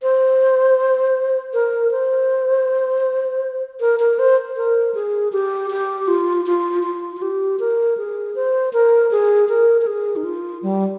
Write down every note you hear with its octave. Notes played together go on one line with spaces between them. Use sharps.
C5
A#4
C5
A#4
A#4
C5
A#4
G#4
G4
G4
F4
F4
F4
F4
G4
A#4
G#4
C5
A#4
G#4
A#4
A#4
G#4
D#4
F4
G3